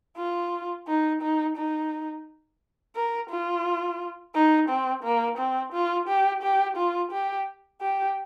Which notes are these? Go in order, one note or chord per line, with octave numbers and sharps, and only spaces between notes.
F4
D#4
D#4
D#4
A#4
F4
D#4
C4
A#3
C4
F4
G4
G4
F4
G4
G4